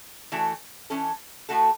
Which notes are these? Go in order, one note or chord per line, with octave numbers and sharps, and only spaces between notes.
E3 A3 F#4 A4
E3 C#4 A4
A2 A3 F#4 A4